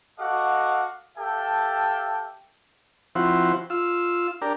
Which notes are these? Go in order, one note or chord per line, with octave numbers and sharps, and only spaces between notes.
F#4 A4 D#5 F5 F#5 D6
G4 A4 E5 F5 G5 A5
F3 C4 E4 F#4
F4 E6
D4 G4 A#4